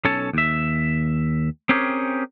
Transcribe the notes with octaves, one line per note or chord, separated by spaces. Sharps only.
B1 C#4 A4 C#5 A5
D#2 E5
C4 C#4 G4 G#4 A#4 C#5